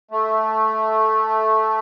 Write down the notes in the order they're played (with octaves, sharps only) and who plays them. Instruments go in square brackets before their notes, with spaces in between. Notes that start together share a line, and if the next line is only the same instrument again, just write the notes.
[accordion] A3